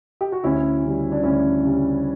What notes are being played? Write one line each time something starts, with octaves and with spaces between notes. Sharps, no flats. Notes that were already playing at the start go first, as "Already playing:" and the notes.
G4
F#4
D2 C#4 E4
C#3 G3
D4
D2 C#4 E4
C#3 G3